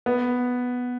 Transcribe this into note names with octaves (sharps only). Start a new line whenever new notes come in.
B3